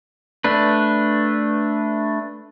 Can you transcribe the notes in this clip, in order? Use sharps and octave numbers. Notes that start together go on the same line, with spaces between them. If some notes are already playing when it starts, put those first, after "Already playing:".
A3 D4 B4